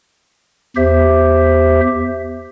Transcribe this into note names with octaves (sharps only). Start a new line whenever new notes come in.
E2 G4 C5 E5